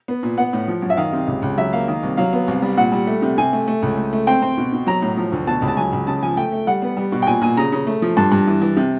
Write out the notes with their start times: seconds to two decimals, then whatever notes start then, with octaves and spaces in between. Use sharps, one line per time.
0.08 B3
0.23 A#2
0.38 B3 F#5
0.53 A2
0.68 F3
0.82 F#2
0.90 E5
0.97 D#3 F5
1.13 C3
1.27 C#2
1.42 C#2
1.57 F#3 E5
1.73 A#3 F5
1.88 D#3
2.03 C2
2.17 F#3 F5
2.33 B3
2.47 C2
2.62 G3
2.77 A#2 F#5
2.92 G3
3.07 A3
3.22 C3
3.38 C3 G#5
3.53 A3
3.68 A3
3.82 C#2
3.97 A3
4.13 A3
4.27 C4 G5
4.42 C4
4.58 B2
4.73 B2
4.87 F#3 A#5
5.02 A2
5.17 F3
5.32 D2
5.47 B2 A5
5.62 C#2
5.68 A5
5.77 F#3 G#5
5.93 C#2
6.07 C#3 A5
6.23 F3 G#5
6.37 A3 G5
6.52 A3
6.67 G3 F#5
6.82 B3
6.97 G3
7.12 B2
7.22 G5
7.26 A#2 G#5
7.41 A#2 G#5
7.57 C#3 A#5
7.72 C#3
7.87 A3
8.02 F3
8.17 G2 A5
8.32 G2
8.47 E3
8.62 E3
8.77 C3